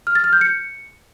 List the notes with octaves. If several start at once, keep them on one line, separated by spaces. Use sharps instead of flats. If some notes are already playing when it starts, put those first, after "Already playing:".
F6
A6
F6
G6
C#7